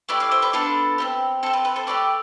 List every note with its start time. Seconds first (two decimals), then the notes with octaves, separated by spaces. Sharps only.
0.09 A3 E4 G4 B4 D5
0.20 D5 F5
0.31 C5 E5
0.42 B4 D5
0.53 B3 D4 F4 A4 B4
0.98 C4 E4 G4
1.43 C4 G4 A4
1.53 B4
1.65 B4
1.76 A4 C5
1.87 A3 D4 G4 B4 D5